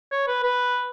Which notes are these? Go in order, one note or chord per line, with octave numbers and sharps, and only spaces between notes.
C#5
B4
B4